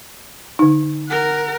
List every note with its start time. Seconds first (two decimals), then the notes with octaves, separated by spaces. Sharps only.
0.59 D3 D#4
1.09 A#4 F#5